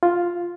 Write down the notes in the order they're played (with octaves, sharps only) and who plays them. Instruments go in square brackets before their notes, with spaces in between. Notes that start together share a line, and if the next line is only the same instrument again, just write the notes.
[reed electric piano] F4